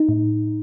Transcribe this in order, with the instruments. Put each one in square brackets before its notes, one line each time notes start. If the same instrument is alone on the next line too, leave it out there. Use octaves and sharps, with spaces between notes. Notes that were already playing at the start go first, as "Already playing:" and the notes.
Already playing: [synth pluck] D#4
A2